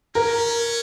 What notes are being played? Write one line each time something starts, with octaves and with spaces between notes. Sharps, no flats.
C#4 A#4